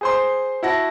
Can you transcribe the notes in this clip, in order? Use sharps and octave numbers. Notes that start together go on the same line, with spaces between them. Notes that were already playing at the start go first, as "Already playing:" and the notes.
G#4 C5 C6
E4 F#4 F#5 A5 A#6